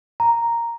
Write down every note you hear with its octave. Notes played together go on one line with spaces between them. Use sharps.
A#5